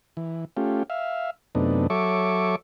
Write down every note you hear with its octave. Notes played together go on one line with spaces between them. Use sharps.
E3
A3 C#4 F4 G4
E5 F5
F#2 C3 A3 B3 D4 D#4
F#3 A4 C#5 E5 C#6 D6